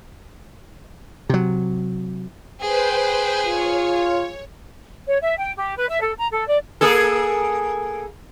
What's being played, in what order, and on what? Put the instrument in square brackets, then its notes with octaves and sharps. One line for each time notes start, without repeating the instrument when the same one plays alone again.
[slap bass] C3 F#3
[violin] G#4 [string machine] B4 C5 G5
[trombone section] F4 [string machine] C#5
[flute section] C#5
E5
G5
G4
B4
E5
A4
A#5
A4
D5
[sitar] A#3 G#4 A4